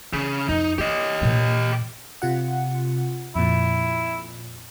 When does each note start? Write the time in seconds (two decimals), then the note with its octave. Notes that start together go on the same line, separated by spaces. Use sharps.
0.13 C#3 E3
0.49 F2 D#4
0.78 A#3 G4 D#5
1.21 A#2 E3
2.22 C3 F4 F#5
3.36 F2 A#2 E4